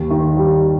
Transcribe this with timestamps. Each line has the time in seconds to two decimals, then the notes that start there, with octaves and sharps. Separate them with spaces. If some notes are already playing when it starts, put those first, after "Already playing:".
Already playing: D#2
0.10 D#3
0.37 G3